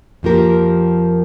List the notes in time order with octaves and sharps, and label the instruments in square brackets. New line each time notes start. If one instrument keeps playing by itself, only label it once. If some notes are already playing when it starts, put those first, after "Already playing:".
[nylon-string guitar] F2 F3 A#3 G4 A#4